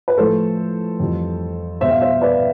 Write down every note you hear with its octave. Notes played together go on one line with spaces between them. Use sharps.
B4
A2 F3 A3 A4 C5
F2 E3 G3
B2 G3 C5 E5
F5
C5 E5
B4 D5